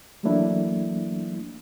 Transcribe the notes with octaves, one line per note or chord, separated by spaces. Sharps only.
E3 F#3 A3 A#3 D4 E4